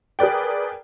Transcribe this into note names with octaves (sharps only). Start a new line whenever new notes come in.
G#4 A#4 B4 D5 G5